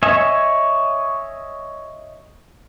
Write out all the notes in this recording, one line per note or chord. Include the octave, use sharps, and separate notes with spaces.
C#5 D#5 E5 G#5